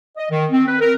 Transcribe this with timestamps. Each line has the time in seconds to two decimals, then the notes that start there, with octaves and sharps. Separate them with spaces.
0.17 D#5
0.31 D#3
0.51 C4
0.67 B4
0.81 A#4